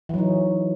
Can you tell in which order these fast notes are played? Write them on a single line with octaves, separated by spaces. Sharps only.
E3 F#3 D#4